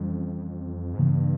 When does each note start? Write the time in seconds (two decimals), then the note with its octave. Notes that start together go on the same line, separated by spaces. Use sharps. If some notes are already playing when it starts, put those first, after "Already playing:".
Already playing: F2 E3 G3 C#4
0.94 G#2
0.99 G2 C#3 E3 A#3